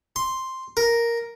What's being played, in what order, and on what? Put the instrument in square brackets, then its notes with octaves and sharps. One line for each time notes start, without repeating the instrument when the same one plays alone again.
[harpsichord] C6
A#4